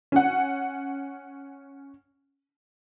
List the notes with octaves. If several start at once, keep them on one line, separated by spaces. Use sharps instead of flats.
C#4 F#5